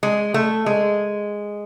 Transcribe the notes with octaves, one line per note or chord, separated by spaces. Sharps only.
G#3
A3
G#3